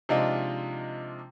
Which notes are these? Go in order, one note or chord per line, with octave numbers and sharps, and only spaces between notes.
C3 F3 G#3 D4 D#4 F4